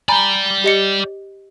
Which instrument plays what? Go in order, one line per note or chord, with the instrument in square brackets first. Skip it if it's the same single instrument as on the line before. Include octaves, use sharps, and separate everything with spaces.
[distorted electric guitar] D5 G5 [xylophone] G#5 A#5 B5
[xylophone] G4 D#5 C#7